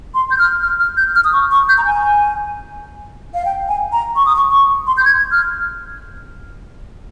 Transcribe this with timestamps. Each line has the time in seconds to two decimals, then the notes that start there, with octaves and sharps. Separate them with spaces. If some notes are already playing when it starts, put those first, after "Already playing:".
0.14 C6
0.31 G6
0.38 F6
0.62 F6
0.80 F6
0.97 G6
1.15 F6
1.24 D#6
1.33 C#6
1.51 C#6
1.69 G6
1.78 A#5
1.85 G#5
3.34 F5
3.45 G5
3.68 G#5
3.92 A#5
4.16 C#6
4.26 D#6
4.35 C#6
4.51 C#6
4.87 C6
4.97 G6
5.05 G#6
5.32 F6